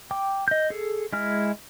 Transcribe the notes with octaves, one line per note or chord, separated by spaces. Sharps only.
G5 D6
D#5 G6
G#4 A4
G#3 E4 G#5 F6